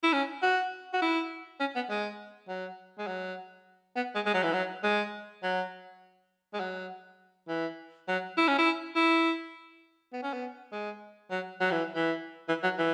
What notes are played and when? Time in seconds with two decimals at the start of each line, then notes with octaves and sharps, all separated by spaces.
0.03 E4
0.13 C#4
0.43 F#4
0.93 F#4
1.02 E4
1.60 C#4
1.75 B3
1.90 G#3
2.48 F#3
2.98 G#3
3.07 F#3
3.96 B3
4.15 G#3
4.26 G#3
4.34 F#3
4.43 E3
4.53 F#3
4.83 G#3
5.43 F#3
6.53 G#3
6.60 F#3
7.48 E3
8.08 F#3
8.37 E4
8.48 C#4
8.58 E4
8.96 E4
10.13 B3
10.23 C#4
10.33 B3
10.72 G#3
11.31 F#3
11.61 F#3
11.71 E3
11.96 E3
12.48 E3
12.63 F#3
12.78 E3